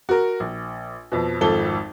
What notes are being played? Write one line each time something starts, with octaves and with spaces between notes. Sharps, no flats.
F#4 A#4
A#1
F2 B2
G#1 F2 A4 G7